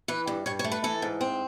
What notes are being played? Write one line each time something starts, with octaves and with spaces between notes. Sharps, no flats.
E3 B4
G2
G2 C#5
C#5
A3
B4
E3 A4
G#2
C4